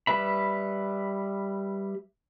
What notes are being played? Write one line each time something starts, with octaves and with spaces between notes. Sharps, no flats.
G3 B4 E5 B5